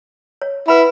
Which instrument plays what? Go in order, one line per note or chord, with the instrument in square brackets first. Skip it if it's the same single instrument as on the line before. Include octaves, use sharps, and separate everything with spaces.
[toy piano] C#5
[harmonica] E4 [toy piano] B4 F#5 B5